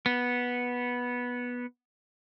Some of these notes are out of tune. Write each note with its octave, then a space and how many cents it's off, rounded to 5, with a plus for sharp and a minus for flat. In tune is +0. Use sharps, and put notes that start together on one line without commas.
B3 -10